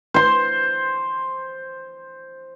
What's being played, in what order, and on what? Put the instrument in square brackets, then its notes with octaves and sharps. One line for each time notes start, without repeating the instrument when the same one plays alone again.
[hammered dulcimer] C5 C6